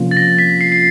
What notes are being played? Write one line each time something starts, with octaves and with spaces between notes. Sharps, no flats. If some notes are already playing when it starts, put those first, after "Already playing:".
Already playing: C3 F3 A#3 C#4 F4
A6
A#6
B6
C7
C7